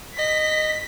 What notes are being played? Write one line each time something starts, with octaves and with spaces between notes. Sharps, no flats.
D#5 B6